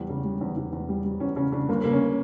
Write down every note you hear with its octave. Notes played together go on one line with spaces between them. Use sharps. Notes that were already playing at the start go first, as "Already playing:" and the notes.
Already playing: E2 G3
C#3
G3
E2
E2
E2
G3
G3
E2 C#4
C#3 C#4
C#3 D4
G1 A#3
C#3 A#3
C#4